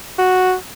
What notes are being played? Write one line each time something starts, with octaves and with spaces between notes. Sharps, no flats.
F#4